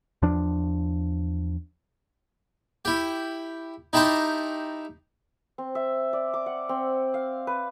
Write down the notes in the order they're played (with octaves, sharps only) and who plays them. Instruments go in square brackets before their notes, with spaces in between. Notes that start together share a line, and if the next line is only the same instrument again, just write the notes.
[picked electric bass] E2 F3 D4
[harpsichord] E4 G4
D#4 E4 G4 A5 A#5 C6
[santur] C4
E5
D5
D6
F#5
C4
F5
B4